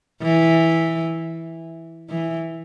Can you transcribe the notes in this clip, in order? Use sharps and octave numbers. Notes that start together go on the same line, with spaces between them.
E3
E3